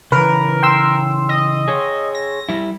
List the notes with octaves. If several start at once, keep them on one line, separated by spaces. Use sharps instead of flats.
C#3 E3 A#4 B4
G5 C6 E6
D#5
G#4 C#5
A#6
G3 E4